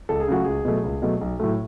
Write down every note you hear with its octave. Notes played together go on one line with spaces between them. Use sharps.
C#2 A4
G#4
C#3 F#3 A3 F#4
C#2 G#4
B2 F#3 A3
C#2
B2 F#3 A3
B1
A2 F#3 A3